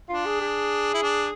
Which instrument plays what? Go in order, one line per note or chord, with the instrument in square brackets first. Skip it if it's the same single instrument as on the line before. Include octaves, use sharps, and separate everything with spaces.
[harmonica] D4 [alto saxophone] F4
[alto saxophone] G#4
G#4
[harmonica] E4
D4